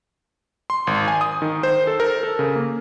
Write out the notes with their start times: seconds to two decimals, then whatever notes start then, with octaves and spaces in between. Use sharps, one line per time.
0.70 C6
0.87 G#1
1.08 G#5
1.21 D#6
1.42 D#3
1.63 C5
1.87 A4
2.00 A#4
2.23 A4
2.39 C#3
2.56 A#3